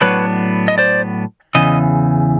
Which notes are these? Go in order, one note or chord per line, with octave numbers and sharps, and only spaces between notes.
A2 F#3 B3 D4 B4 C#5
D#5
C5 D5
E2 C#3 E3 D#5